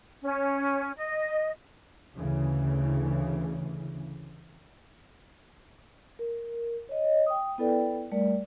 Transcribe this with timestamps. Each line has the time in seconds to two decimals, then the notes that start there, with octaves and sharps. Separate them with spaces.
0.23 C#4
0.97 D#5
2.17 D2 C#3 E3
6.19 A#4
6.89 C#5 D#5
7.26 G5 D#6
7.58 B3 E4 A4 B4 D5 G5
8.11 G3 A3 A#4 D5